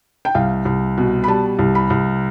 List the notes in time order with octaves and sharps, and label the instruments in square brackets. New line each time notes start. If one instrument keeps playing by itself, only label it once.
[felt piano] G5
C2 F5
C2
B2
B5
G3 A5
C2
B5
C2